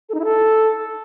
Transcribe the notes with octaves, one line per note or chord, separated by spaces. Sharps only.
A4
D#4
E4
A4